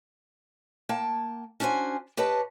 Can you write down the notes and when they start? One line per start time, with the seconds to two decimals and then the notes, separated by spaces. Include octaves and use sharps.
0.89 A#3 G5 A5
1.60 C#4 D4 F#4 C5 G#5
2.17 G4 B4 C#5 D#5 A5